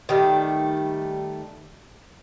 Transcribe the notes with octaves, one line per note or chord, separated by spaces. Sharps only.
D#3 G3 A3